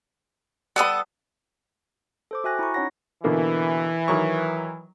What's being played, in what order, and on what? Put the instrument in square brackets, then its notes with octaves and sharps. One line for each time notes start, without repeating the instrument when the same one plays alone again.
[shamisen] G3 B5 [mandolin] B3 A4 D#6
[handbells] A4 C5 D6
F#4 E5 G5 G#5 F#6 A#6
E4 A#5 C#6
C#4 D#4 C#5 F#5 A#6
[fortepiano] B2 D3 A#3 [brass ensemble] E3
[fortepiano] D#3 F#3 C#6